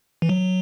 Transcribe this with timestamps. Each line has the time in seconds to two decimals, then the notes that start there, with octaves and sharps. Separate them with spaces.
0.22 E3
0.29 F#3